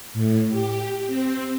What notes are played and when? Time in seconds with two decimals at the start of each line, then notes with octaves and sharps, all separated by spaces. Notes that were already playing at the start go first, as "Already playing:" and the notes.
0.13 A2
0.50 G4
1.06 C4